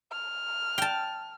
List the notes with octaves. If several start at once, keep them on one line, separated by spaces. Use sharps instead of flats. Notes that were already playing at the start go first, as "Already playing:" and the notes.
F6
G5 A5